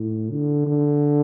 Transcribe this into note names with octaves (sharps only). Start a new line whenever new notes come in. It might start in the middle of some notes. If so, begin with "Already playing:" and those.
Already playing: A2
D3
D3